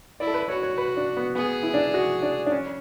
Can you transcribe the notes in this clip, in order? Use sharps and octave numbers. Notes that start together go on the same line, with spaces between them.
E4 D5
A4
B4
F#4 C#5
C#5
B4
D4
B3
B3 G#4
E4
D4
F#4
D4
D4
C#4